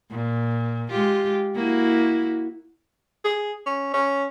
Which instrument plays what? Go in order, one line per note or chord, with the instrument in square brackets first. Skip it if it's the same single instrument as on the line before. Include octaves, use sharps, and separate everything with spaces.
[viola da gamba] A#2
G#3 F4 G4
A#3 E4 F#4
[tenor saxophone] G#4
C#4
C#4